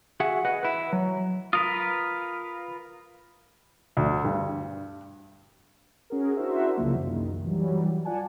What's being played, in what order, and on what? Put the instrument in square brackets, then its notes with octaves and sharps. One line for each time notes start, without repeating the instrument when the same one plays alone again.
[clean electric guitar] F#4 G#4 E5 F#5
B4 D#5 F#5
E4 B4
F#3
[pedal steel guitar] F4 A#4 B4 [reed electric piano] D#6
[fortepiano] D2
G2
[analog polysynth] C#4 F#4 G#4 A#4
D4 E4 F#4 A#4 C5 E5
C2 G2 C#3 F3 F#3 A#3
C2 F#2 D#3
E3 F#3 G3
F4 D5 F#5 G#5 A5